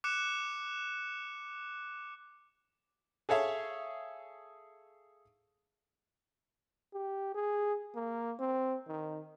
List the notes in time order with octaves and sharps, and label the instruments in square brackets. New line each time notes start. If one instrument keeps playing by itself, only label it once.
[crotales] D6 F#6 C#7 E7
[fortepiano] G#4 A4 C#5 E5 F5
[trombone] G4
G#4
A#3
C4
D#3